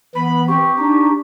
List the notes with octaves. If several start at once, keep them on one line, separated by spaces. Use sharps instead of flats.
E3 B3 B5
C4 G4 C#6
D4 D#4